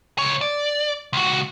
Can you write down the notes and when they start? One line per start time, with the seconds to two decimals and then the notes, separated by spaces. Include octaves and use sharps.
0.18 C#2 C#5
0.41 D5
1.13 C#2 F#4